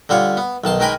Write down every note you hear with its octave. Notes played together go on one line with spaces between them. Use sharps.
D3 G3 F4 C#5
B3
B1 D#3 A5 C6
D#3 G#3 A#4 G5 G#5 B5